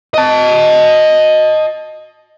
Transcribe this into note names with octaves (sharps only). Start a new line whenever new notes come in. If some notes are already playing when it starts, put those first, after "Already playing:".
D#5 A5